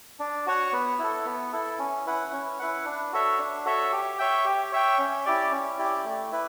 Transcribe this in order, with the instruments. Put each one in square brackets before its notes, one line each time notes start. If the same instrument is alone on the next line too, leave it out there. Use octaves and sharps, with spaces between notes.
[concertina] D4
F#4 C#5 F#5
B3
E4 A4
B3
E4 A4
C#4
E4 B4 F#5
C#4
E4 B4 F#5
D4
F#4 A4 C#5 E5
D4
F#4 A4 C#5 E5
G4
C#5 E5 G5
G4
C#5 E5 G5
C#4
E4 G4 D5
C#4
E4 G4 D5
A3
E4 B4